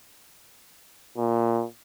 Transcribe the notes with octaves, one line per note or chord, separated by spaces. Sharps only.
A#2